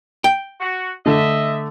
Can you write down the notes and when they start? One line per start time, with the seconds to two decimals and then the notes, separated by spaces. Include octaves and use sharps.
0.24 G5
0.61 F#4
1.06 D3 A3 D#5 E5